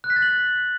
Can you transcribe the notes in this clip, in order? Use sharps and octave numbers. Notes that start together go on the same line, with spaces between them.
F#6
B6
A6
F#7
B6